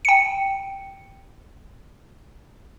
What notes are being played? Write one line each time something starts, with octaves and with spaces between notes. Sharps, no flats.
G5 C#7